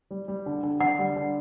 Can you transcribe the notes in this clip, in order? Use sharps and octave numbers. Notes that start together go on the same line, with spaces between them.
G3
G3
D3
D3
D3 F#5
G3
D3